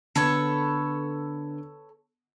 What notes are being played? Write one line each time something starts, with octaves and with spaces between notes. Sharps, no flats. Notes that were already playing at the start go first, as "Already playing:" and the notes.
D3 B3 A4 B4 C#5